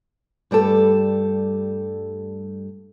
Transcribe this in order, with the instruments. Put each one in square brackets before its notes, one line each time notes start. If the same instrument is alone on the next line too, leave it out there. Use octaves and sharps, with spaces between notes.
[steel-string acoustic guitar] G2 G3 A3 A4